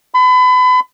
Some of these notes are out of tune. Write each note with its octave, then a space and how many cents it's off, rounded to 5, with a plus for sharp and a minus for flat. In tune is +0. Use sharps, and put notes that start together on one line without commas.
B5 +35